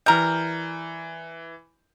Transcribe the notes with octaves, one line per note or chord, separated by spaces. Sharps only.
E3 G3 A#4 G6